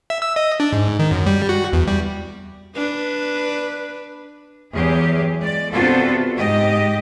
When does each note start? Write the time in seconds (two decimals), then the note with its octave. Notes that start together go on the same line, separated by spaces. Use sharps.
0.10 E5
0.22 E6
0.36 D#5
0.60 D4
0.72 G#2
0.99 D#3
1.11 F#2
1.26 G3
1.49 F#4
1.73 E2
1.87 G3
2.75 D4 B4
4.73 E2 F#3 G4 G#4
5.39 G#3 D5
5.71 C3 B3 D4 F4 F#4 A4
6.35 G#2 G4 D#5